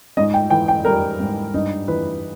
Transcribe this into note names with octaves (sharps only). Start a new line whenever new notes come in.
G#2 D#5
G5
E3 G5
G5
G3 A#4
G#2
G2 D#4
E3 B4